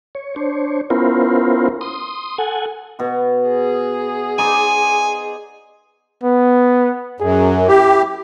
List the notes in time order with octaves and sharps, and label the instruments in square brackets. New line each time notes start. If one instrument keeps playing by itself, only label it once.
[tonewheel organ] C#5
D4 C5 C#5
B3 C#4 E4 F4 A#4 C5
C6 D#6
A4 F#5 G#5
[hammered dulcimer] B2 F#4
[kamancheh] G#4
[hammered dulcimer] D#4 C5 D5 [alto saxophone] G#5
[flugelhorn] B3
[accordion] F#2 [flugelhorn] G#4
[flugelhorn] E4 [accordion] G4